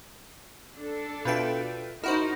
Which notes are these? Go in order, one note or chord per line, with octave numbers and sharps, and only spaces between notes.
D4 A4
B2 F4 B4 E5 G5
D#4 E4 F#4 A#4 C5